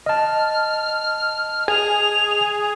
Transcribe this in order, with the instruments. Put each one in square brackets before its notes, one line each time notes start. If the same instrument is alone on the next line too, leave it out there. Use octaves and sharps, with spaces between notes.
[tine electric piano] D#5 A5 [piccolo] F6
[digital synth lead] G#4 [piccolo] F7